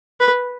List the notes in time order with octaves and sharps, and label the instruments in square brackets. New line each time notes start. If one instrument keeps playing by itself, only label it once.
[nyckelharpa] B4